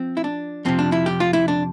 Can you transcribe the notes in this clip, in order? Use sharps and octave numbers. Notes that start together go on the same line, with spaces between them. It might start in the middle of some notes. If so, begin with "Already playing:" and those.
Already playing: F3 C4
E4
D4
F2 C3 F3 C4
D4
E4
G4
F4
E4
D4